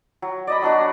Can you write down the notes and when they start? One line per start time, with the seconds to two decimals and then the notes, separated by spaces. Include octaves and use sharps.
0.22 F#3
0.47 D5 D#5 B5
0.62 F#3 D4 F#4